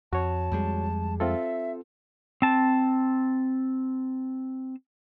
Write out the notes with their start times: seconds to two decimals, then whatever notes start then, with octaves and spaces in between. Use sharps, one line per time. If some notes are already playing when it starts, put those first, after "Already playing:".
0.13 F2 F#4 C#5 A5
0.52 F2 G3 G#3
1.20 C4 F4 A4 E5
2.42 C4 A5